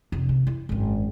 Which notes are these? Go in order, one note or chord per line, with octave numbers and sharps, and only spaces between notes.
F1
C3
E4
G#1 F#2